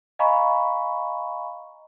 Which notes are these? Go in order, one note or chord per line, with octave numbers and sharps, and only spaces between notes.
D#5 F5 G#5 A#5 B5 C#6